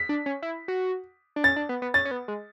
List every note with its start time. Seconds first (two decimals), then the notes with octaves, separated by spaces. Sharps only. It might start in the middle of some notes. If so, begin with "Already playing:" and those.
Already playing: B6
0.09 D4
0.26 C#4
0.42 E4
0.68 F#4
1.36 D4
1.44 C#4 A6
1.56 D4
1.69 B3
1.82 B3
1.94 C#4 A6
2.05 C#4
2.11 B3
2.28 G#3